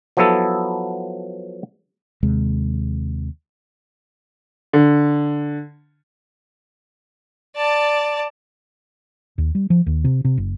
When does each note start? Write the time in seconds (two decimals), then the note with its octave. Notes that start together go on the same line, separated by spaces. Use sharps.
0.17 F3 F#3 B3 E4 A4
2.23 D#2 C3 G#3
4.73 D3
7.56 D5 A5
9.38 D#2
9.55 G3
9.70 F3
9.86 D#2
10.04 C3
10.25 C3
10.37 F#1